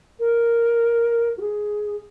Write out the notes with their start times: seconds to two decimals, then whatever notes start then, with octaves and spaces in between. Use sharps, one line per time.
0.19 A#4
1.37 F#4
1.41 G#4